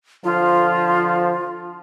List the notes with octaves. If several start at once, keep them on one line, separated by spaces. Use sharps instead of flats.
D3 F3 F4